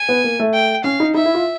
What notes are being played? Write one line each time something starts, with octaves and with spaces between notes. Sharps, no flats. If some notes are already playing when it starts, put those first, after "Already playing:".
Already playing: G#5
B3
A#3
A3
G5
C#4 F5
D#4
D#4 E5
E4
F4